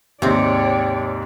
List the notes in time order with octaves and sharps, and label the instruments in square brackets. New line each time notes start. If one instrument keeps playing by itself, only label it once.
[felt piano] D#2 G#2 [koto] C3 C4 [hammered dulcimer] G4 [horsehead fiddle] C#5 D5